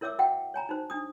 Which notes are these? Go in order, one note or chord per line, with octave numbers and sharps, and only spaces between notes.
E4 A#4 C#5 E5 D6 E6
F#4 E5 F#5 G5
C#5 G#5 A#5
D#4 F#4 C5
D4 D#6